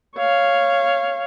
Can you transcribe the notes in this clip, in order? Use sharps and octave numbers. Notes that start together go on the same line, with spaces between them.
C#5 F5